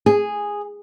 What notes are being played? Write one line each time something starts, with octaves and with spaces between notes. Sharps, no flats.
G#4